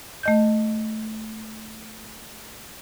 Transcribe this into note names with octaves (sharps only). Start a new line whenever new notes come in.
A3 D#5 G6